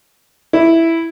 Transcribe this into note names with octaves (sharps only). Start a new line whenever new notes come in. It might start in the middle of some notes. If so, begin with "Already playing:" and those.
E4